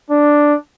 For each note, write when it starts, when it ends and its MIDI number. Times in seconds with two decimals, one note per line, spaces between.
0.10 0.55 62